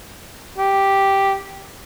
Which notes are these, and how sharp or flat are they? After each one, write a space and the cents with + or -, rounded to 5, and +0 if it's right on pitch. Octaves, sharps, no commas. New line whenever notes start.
G4 +0